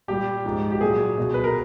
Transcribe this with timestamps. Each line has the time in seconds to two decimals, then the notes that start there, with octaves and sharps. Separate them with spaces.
0.08 A#2 G3 G4
0.44 G#2 F3
0.71 G4
0.81 A#2 F#3 G#4
1.18 B2 F#3
1.34 B4
1.44 A#4